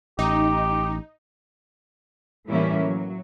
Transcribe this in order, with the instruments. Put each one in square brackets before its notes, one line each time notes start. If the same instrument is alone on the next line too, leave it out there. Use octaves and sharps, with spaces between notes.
[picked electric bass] A1 [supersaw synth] D#4 [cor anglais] G4
[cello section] A2 E3 G3 A#3 C#4 E4
F#3